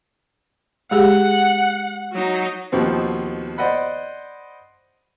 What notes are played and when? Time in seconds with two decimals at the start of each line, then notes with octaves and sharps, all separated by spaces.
0.91 G#3 G4 G#4 F#5
2.13 F#3 D#4
2.72 D#2 B2 D#3 F3 B3 C4
3.58 C5 D5 D#5 F#5 B5